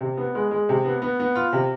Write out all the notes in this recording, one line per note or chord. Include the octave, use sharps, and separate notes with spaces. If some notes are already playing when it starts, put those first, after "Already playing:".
C3
B3
G#3
G#3
C3
B3
B3
B3
F4
C3